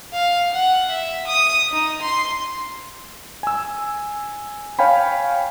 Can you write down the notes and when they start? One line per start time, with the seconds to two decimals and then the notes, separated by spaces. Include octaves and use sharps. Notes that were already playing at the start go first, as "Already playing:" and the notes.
0.13 F5
0.53 F#5
0.90 E5
1.27 D#6
1.72 D#4
2.02 C6
3.43 G#5 E6
4.79 C#5 F5 G5 G#5 B5